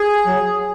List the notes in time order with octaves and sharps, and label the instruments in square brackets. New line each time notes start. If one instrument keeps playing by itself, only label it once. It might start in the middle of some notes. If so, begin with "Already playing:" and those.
Already playing: [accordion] G#4
F#3